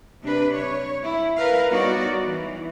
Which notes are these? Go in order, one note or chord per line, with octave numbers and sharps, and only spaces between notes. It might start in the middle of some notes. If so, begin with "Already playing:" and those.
C3 D4 B4
C#5
E4
A#4 B4 F5
G3 B3 D#4 F#4 C#5 D5
E3